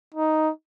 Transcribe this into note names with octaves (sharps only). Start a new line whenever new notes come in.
D#4